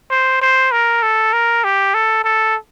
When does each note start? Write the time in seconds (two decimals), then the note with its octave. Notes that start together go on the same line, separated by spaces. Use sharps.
0.10 C5
0.41 C5
0.72 A#4
1.03 A4
1.33 A#4
1.64 G4
1.94 A4
2.24 A4